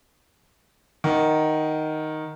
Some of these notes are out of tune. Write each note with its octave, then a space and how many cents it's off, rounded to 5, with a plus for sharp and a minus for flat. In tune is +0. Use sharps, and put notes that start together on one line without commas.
D#3 +0 F#5 +0